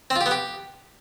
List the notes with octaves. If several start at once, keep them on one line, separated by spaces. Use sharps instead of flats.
C4
F4
G4
B3
G4